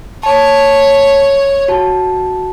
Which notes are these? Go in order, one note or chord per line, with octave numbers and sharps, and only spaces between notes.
C#5 A5
F#4 A5